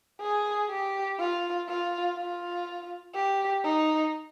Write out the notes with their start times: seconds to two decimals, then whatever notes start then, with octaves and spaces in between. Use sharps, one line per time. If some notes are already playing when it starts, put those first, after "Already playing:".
0.21 G#4
0.70 G4
1.20 F4
1.69 F4
2.18 F4
3.15 G4
3.65 D#4